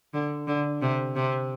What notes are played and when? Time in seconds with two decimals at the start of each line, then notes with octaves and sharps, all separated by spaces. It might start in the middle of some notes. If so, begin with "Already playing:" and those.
0.14 D3
0.47 D3
0.82 C3
1.16 C3